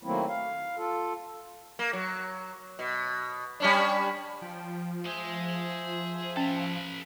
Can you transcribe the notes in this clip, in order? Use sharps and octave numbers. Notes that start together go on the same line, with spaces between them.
D#3 F#3 A3 A#3 C4 E4
F5
F4 A4
A#3
F#3
B2
G3 C#4 D4
F3 G5
G#4 C5 E5 G#5 C6
C#4 A4 B4 G5